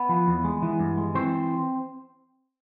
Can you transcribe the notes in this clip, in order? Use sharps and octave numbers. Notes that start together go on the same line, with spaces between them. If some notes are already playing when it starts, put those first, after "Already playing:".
Already playing: B3 B4
F3
E2
G#3
E3
G2
G#3
E3 C4 C5